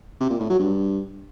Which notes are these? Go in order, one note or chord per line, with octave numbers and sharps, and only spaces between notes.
C3
A#2
A2
F#3
G2